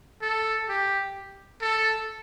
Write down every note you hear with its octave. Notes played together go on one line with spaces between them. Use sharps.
A4
G4
A4